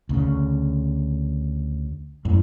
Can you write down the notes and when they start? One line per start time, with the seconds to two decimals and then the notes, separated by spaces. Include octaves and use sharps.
0.09 D2 C#3
2.25 F#2 A2